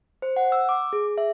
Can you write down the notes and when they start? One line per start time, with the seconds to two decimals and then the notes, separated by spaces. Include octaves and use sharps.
0.22 C5
0.36 F#5
0.52 E6
0.69 D6
0.93 G#4
1.18 E5